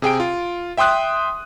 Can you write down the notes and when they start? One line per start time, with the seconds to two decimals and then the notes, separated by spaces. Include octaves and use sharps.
0.02 C3 G#4 G5 D7
0.20 F4
0.77 E5 G5 C6 D#6 F#6